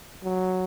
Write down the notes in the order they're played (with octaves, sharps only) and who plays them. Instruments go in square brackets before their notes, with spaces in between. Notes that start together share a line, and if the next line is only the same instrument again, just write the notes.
[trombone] F#3